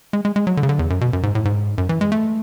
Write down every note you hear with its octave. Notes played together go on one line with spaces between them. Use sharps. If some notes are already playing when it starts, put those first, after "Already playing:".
G#3
G#3
G#3
F#3
D3
C#3
D3
E2
F#2
B2
F#2
G#2
A2
G#2
F#2
E3
G#3
A3